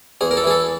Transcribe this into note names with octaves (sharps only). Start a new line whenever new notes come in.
E2 G#4
A#4
A4
E3 G#4
A4